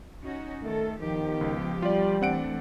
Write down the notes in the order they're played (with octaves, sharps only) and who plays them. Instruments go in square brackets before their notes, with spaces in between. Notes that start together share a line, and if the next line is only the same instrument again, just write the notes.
[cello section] C#4 D#4 F#4
[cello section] D#3 A4 [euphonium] A3
[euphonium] D#3 [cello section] F3 B3 G4
[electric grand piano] C#2
[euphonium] G3 [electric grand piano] F4 D5
[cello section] E3 A3 D4 [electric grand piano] C4 F#5 D7